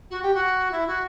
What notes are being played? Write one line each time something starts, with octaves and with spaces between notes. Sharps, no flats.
F#4
G4
F#4
E4
F#4